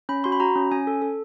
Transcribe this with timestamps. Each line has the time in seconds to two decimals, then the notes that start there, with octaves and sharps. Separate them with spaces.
0.09 C#4 B5
0.24 F#4 C6
0.32 B5
0.40 F#4 A#5
0.56 C#4
0.71 C#4 G#5
0.87 A4
1.02 A4